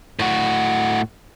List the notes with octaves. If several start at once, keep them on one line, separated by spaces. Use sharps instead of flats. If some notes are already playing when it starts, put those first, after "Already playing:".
A2 F#4